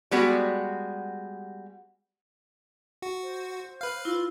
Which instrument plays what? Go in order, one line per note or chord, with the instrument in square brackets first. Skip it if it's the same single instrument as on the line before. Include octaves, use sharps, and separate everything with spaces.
[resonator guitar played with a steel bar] G3 G#3 B3 F#4
[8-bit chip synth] F#4
[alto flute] C5
[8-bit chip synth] B4 F5
[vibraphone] E4 [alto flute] F4